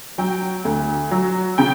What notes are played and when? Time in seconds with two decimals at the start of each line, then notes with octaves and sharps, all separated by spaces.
0.18 F#3 G5
0.65 D2
1.11 F#3
1.58 C#3 G5